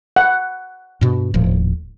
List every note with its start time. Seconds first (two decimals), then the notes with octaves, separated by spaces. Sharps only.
0.16 F#5
1.01 G2 B2
1.34 D#1 A2 F3